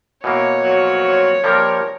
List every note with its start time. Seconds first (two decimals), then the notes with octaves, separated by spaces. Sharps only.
0.24 B2 E3 A#3 C#5
0.63 F2 A#2 F#3
1.44 F3 G3 A#3 A#4